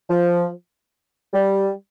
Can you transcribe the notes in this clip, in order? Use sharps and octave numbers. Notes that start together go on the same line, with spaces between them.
F3
G3